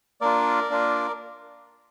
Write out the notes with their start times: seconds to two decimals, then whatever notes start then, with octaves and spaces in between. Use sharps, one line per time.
0.21 A#3 D4 F4 A#4 D5
0.69 A#3 D4 F4